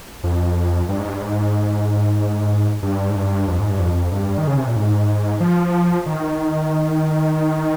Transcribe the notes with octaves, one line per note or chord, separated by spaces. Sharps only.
F2
G2
G#2
G2
G#2
G2
G#2
G2
F2
G#2
G2
F2
G2
D#3
C#3
C3
A#2
G#2
F3
D#3